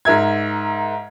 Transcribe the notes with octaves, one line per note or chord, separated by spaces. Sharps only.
G#2 A#4 E5 G#6